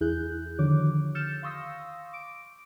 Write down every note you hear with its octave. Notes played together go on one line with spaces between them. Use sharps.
E2 E4 G#4 F#6 G6
D3 D#3 F3 F#4 C#5 D6
E6 F6 G6 A6 C#7 E7
F5 C6 C#6 D#6 E6 A#6
D6 D7